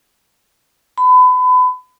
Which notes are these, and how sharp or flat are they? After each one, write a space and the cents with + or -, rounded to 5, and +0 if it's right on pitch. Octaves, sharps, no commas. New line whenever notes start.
B5 +30